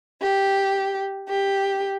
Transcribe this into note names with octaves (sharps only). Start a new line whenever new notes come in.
G4
G4